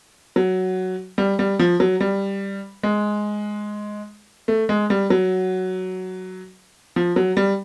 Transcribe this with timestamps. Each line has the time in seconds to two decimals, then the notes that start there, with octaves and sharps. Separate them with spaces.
0.36 F#3
1.18 G3
1.39 G3
1.59 F3
1.80 F#3
2.00 G3
2.83 G#3
4.48 A3
4.69 G#3
4.90 G3
5.10 F#3
6.96 F3
7.16 F#3
7.37 G3